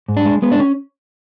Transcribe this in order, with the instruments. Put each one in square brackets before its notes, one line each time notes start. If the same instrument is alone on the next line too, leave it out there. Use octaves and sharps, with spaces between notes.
[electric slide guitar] G#2
D4
G#3
G#3 B3
D4
C#4